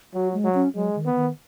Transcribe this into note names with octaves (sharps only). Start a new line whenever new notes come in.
F#3 F#4
G#3
F#3
C#4
F#3 G#3
D#3
B3
D#3